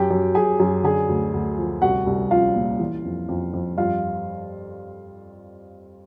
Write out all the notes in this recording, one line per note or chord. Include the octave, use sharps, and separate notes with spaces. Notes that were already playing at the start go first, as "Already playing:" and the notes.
Already playing: F#2 G4 G5
F#2
F#2 G#4 G#5
F#2
D3 G#4 G#5
D2
D2
F3
C2 F#4 F#5
C2
F3 F4 F5
A#2
E3
F2
F2
F2
G2 F4 F5